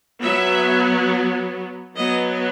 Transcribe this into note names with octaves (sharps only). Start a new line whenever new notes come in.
F#3 B3 E5
F#3 B3 D#5